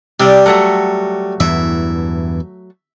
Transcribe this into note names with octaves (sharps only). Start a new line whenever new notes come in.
C3 G3 D5
F#3 A3 F#4
E2 G2 E3 E5